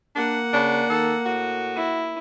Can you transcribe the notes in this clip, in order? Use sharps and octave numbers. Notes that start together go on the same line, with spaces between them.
A#3 D4 F#5
C#3 D4
D#3 A4
A2 F#4
E4